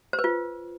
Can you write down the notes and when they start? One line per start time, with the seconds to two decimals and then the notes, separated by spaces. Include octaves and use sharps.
0.13 C5
0.19 B4
0.24 F4